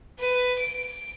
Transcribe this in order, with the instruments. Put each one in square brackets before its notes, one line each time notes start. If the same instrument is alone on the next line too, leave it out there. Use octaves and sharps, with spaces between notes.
[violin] B4
D7